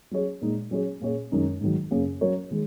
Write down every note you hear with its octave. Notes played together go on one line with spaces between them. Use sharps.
F#3 C#4 G#4 C#5
A#2 G#3 D#4
F#3 C#4 G#4 C#5
A#2 A#3 C#4 G#4 C#5
F#2 D#3 G#3 D#4
G#2 D#3 F#3
F#2 C#3 A#3 C#4 G#4
F#3 C#4 A#4 C#5
D#3 G#3